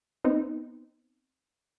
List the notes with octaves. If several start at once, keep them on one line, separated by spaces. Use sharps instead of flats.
B3 C4 D#4